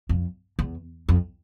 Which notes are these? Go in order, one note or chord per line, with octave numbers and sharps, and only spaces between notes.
F2
E2
F2